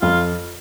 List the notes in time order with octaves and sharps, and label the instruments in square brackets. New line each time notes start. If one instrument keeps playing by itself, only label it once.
[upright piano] F2 [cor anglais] F4